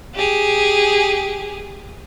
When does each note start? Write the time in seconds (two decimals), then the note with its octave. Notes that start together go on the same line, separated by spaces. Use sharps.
0.15 G4 G#4